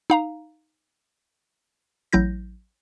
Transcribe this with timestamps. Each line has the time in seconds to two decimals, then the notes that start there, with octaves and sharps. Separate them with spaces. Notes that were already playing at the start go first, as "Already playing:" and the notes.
0.10 D#4 F5 A#5
2.13 A1 F#3 E4 G6 A#6